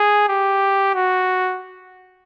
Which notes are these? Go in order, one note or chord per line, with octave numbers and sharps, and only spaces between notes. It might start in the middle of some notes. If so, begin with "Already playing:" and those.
Already playing: G#4
G4
F#4